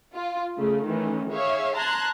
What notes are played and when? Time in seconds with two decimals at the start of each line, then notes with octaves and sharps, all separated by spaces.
0.14 F4
0.57 C#3 A3
0.86 D#3 E3 A3 C#4
1.31 G#4 C#5 E5 F5
1.76 A5 A#5 C6 F#6 G#6